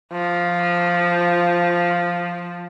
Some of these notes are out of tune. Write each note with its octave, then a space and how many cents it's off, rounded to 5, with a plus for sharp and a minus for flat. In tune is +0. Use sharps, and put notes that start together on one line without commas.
F3 +0